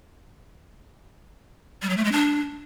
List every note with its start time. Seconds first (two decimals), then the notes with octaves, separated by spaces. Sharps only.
1.82 G3
1.90 F#3
1.97 A3
2.05 G#3
2.12 D4